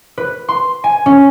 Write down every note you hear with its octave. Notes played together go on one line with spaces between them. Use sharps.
B4
C6
G#5
C#4